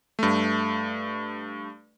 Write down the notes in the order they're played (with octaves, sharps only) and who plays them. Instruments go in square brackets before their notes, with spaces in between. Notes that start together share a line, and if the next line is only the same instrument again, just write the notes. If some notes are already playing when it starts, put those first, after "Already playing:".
[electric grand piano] G2 A3